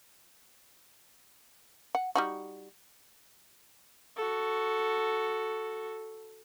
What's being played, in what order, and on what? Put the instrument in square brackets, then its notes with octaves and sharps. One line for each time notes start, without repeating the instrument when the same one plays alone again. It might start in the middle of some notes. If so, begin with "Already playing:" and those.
[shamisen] F#5
G3 D#4 F#4
[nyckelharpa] F#4 A4